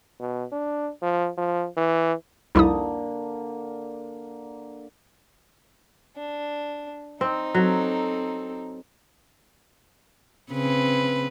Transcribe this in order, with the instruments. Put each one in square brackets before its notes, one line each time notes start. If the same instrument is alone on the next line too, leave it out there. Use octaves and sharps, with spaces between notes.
[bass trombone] B2
D4
F3
F3
E3
[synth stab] C2 F2 G3 [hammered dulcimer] D3 A#3 [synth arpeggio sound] D#4 E4 D#6
[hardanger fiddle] D4
[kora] C4 [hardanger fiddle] D#4
[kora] F#3 [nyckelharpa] C4 A4
[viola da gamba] C#3 C4 B4